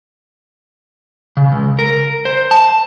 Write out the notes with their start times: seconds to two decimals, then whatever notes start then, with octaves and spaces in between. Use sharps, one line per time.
1.37 C#3
1.52 C#2
1.79 A#4
2.25 C5
2.51 A5